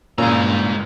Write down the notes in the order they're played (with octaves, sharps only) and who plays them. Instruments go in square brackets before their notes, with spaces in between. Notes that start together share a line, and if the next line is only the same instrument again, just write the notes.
[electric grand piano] C#2 E4 E6 [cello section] G2 [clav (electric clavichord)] A#2 C#4 [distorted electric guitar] G#3 A#5